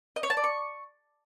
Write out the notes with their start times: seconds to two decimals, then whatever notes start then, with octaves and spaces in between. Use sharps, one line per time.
0.16 D#5
0.23 C#5
0.30 A5
0.37 D5
0.44 C#6